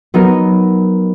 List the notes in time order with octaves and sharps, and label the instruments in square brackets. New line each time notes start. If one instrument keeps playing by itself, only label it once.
[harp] F#3 B3 D#4 A#4